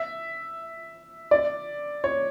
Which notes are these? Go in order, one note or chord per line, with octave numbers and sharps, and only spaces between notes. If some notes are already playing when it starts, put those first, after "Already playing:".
Already playing: E5
D5
C#5